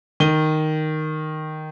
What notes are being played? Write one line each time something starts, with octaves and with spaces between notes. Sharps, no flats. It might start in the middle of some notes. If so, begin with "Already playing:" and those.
D#3 D#7 G7